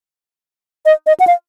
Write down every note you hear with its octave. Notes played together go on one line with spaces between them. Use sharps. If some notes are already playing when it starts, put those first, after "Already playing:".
D#5
D#5
F#5
F5